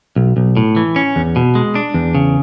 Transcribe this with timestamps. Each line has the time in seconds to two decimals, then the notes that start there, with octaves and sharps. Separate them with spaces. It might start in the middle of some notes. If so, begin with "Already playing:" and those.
0.16 B1
0.37 B1
0.57 A2
0.76 E3
0.96 C#4
1.16 E2
1.36 B2
1.55 G#3
1.75 D4
1.94 E2
2.15 C#3